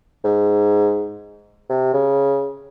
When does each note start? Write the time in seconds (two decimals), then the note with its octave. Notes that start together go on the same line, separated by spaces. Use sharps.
0.24 G#2
1.69 C3
1.93 C#3